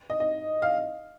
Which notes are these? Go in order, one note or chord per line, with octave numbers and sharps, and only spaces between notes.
D#5
D#5
F5